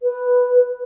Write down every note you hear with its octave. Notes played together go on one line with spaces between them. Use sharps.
B4